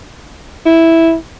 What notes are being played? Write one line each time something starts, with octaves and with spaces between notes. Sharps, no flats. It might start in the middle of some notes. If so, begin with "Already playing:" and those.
E4